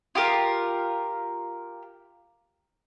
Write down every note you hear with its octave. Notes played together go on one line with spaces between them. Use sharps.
F4 G4 A#4